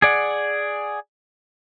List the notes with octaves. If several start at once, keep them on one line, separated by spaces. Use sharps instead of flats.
G#4 D5 F#5